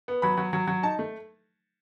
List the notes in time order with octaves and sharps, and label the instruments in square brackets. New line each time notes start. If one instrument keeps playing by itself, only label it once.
[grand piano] B3
F#3 B5
F#3
F#3
F#3
D#4 A5
A3